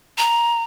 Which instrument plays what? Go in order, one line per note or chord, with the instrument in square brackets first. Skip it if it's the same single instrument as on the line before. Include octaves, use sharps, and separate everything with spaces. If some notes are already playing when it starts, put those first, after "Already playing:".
[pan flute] A#5